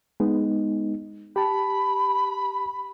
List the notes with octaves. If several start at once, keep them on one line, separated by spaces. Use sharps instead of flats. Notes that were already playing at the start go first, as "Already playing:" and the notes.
G#3 B3 D#4
G4 A5 B5